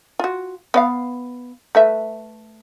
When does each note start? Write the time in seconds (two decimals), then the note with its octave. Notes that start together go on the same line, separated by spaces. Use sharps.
0.19 F4 F#4
0.74 B3 D5 F5
1.75 A3 B4 E5